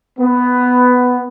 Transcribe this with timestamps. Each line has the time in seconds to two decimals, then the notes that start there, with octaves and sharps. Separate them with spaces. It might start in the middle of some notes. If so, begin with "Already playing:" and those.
0.18 B3